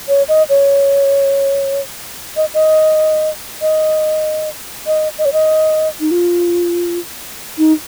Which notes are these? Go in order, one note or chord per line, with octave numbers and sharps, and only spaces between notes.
C#5
D#5
C#5
D#5
D#5
D#5
D#5
D#5
C#5
D#5
D#4
F4
D#4